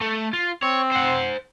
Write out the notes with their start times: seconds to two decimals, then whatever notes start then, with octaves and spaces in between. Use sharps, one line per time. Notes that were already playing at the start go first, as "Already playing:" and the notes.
0.01 A3
0.33 F4
0.63 C4 C#5
0.92 C5 F#5